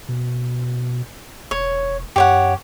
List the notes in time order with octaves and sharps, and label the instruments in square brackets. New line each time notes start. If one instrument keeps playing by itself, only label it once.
[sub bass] B2
[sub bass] E1 [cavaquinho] C#5
[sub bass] F#2 [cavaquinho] G4 C#5 F#5